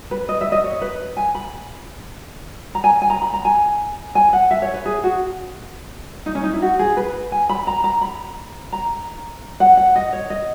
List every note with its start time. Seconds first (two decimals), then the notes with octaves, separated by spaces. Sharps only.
0.11 B4
0.29 D#5
0.41 E5
0.52 D#5
0.64 C#5
0.81 B4
1.17 G#5
1.35 B5
2.75 A#5
2.84 G#5
3.02 G#5
3.10 A#5
3.22 B5
3.34 A#5
3.45 G#5
4.15 G#5
4.33 F#5
4.51 E5
4.62 C#5
4.74 B4
4.86 G#4
5.04 F#4
6.26 D#4
6.35 C#4
6.44 D#4
6.53 E4
6.62 F#4
6.79 G#4
6.97 B4
7.32 G#5
7.50 B5
7.67 A#5
7.84 A#5
8.02 B5
8.73 A#5
9.60 F#5
9.77 F#5
9.96 D#5
10.13 C#5
10.30 D#5